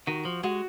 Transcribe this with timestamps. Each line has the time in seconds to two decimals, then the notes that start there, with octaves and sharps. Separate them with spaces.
0.07 D#3 F#4
0.25 F3
0.43 G#3 F#4